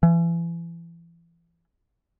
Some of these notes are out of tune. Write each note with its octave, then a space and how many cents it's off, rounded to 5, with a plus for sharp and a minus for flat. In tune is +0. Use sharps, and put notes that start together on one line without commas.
E3 +35